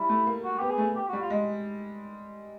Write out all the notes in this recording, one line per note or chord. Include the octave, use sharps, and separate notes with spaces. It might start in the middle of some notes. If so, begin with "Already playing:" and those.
Already playing: G3 E4
A3
A#3
F#4
B3 G4
G#4
A3
G4
F#4
G3
F4
G#3